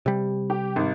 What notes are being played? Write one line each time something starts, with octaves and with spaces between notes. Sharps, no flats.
C3 G3
G4
G#1